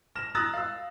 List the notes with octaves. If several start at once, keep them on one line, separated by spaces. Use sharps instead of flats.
F6 A#6 E7
A#5 D#6 E6 F#6 A6 A#6
F5 E6